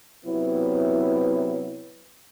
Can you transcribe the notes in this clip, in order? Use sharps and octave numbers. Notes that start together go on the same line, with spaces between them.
C3 F#3 B3 E4